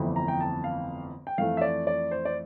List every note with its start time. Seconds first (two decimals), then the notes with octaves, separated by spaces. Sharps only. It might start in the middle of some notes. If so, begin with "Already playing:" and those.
Already playing: G1 F2 E3 A3 C4
0.16 A#5
0.28 G5
0.40 A5
0.64 F5
1.27 G5
1.38 F2 E3 A3 F5
1.57 E5
1.61 D5
1.87 D5
2.11 C5
2.25 D5